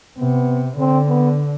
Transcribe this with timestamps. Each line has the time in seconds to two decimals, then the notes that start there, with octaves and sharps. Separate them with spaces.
0.19 C3 B3
0.78 D3 C4
1.08 B3